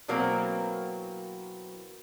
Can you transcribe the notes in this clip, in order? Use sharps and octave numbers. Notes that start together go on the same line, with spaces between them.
B2 E3 F#3 A#3 C4 A#5